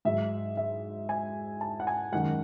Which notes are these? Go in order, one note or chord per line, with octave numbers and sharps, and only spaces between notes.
G#2 F#3 E5
E5
G#5
A5
F#5
G#5
F#2 D#3 G#3 F#5